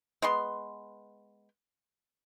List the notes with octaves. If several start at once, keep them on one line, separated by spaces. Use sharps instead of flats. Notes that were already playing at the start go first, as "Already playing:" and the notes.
G#3 B3 C6